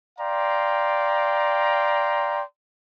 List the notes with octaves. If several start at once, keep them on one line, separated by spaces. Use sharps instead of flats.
D5 F5 G5 A#5 C6